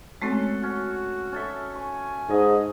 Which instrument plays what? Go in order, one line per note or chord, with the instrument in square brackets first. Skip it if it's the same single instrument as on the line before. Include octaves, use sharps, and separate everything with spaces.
[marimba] G#3 A3 C4 [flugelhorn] C#4 [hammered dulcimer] F#4 A4
[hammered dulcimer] C#4 [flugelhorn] F#4
[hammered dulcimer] C#4 A4 E5
[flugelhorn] G#5 [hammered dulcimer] C#6
[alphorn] G#2 [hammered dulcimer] G#4 D#5